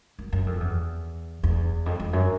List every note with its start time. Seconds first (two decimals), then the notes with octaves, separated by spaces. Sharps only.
0.19 F#2
0.32 F#2
0.46 F2
0.60 E2
1.43 E2
1.86 F2
2.00 F2
2.13 F#2